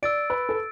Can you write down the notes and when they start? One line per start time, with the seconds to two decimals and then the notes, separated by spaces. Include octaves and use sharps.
0.03 D5 E6 A6 D7
0.30 B4
0.49 A4